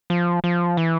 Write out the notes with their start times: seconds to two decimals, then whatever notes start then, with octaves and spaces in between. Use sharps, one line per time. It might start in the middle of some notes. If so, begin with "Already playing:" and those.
0.10 F3
0.44 F3
0.77 E3